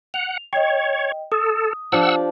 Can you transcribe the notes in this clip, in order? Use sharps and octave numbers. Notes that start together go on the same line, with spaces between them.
F#5 F7
C#5 D#5 G5
A4 D#6
F3 D4 G4 F#5 E6